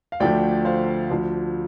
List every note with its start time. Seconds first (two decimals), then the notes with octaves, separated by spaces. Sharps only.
0.12 F5
0.20 D2 D3 F3 A3 D5 G5
0.65 C5 F5
1.10 D2 D3 F3